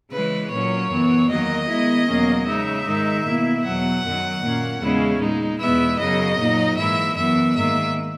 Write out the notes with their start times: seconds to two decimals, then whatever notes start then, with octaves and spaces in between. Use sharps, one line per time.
0.11 C#3 E3 G#3 B4
0.50 A#2 F#3 C#4 C#5
0.90 F#2 E3 B3
1.29 E2 D#3 F#3 A#3 D#5
1.68 D#3 G#3 B3 E4
2.08 E2 B2 F#3 A#3 C#4
2.46 C#3 G#3 D#4 E5
2.86 G#2 D#3 G#3 D#4
3.24 B2 A#3 E4
3.64 E2 B2 F#3 F#5
4.03 F#2 D#3 F#3
4.42 A#2 A#3 C#4
4.81 E2 C#3 G#3 C#4 E4
5.20 A#2 G#3 D#4
5.60 E2 B2 G#3 B3 E4 E5
5.98 F#2 C#3 F#3 D#5
6.38 A#2 F#3 A#3 D#4
6.77 G#2 E3 A#3 E4 E5
7.16 F#2 E3 B3 E5
7.55 G#2 D#3 A#3 E5